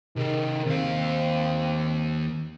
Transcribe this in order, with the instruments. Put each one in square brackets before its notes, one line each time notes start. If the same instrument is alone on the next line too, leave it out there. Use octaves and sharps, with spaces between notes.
[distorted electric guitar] C3 G#4 [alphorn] D#3
[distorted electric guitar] D#2 F5 [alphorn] C4